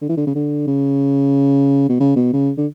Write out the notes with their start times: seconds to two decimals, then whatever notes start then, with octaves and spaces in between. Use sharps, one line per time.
0.01 D3
0.09 E3
0.17 D3
0.27 C#3
0.35 D3
0.67 C#3
1.89 B2
2.00 C#3
2.16 B2
2.33 C#3
2.57 D3